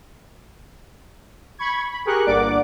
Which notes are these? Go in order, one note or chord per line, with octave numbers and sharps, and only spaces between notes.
B5 C#6 G#6
B5
G4 G#4 A#4 C#6 F#6
G1 G2 A#3 D5 F#5 D6